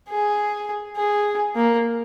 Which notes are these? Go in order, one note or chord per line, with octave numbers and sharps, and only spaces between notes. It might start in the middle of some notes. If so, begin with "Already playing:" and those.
G#4
G#4
A#3